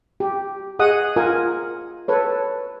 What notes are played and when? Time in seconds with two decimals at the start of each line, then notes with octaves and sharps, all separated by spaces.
0.20 G4
0.79 G#4 D#5 F#5 D#6
1.16 F4 A#4 G#5 D#6
2.08 A4 B4 C#5